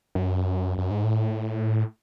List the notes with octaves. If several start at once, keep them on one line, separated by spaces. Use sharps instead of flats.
F#2
F#2
G#2
A2